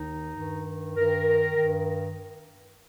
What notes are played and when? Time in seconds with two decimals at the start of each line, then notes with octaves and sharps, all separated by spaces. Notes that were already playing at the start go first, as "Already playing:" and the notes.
Already playing: D#2 D#3 D#4
0.35 G2 D#3
0.96 G2 D#3 A#4
1.56 G2 D#3